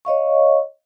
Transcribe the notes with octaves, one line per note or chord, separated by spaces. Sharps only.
C#5 D#5 F5 C#6